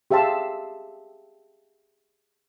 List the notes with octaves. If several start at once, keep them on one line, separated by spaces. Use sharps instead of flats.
G4 G#4 E5 F5 A5 C6